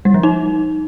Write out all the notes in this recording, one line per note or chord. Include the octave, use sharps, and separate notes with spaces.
G3
F3
D#4